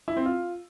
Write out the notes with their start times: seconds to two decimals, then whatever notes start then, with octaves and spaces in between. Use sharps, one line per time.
0.08 E4
0.17 C4
0.26 F4